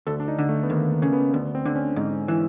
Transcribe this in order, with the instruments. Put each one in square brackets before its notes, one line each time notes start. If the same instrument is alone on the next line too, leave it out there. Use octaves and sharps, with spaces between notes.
[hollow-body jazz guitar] D2 [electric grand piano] A4
[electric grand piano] D4
D#4
[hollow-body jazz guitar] D3
[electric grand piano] A3
B3
[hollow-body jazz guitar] D#2 [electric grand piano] A#3
[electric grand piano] A#3
[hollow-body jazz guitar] C#3 [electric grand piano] A#3
[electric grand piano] B3
[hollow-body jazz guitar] D2 [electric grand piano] B3
[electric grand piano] C4
[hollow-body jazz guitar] D3
[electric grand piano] C#4
[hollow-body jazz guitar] G#2 [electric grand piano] D#4
[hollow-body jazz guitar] E3